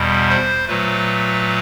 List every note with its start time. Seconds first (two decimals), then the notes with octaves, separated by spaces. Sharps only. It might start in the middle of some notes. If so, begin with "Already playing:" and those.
Already playing: E2 B2 G3
0.29 C5
0.68 A#2 F#3 A3 B4